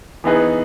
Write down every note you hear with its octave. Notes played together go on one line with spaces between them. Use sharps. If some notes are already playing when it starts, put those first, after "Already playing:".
E3 B3 D#4 G#4 B4